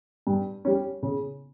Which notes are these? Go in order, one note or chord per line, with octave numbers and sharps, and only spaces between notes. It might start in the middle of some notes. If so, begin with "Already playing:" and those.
G2
G3 C#4
C#3